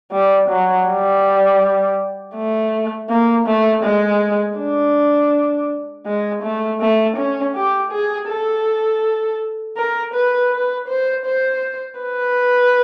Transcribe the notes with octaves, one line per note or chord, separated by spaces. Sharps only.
G3
F#3
G3
A3
A#3
A3
G#3
D4
G#3
A3
A3
C#4
G4
G#4
A4
A#4
B4
B4
C5
C5
B4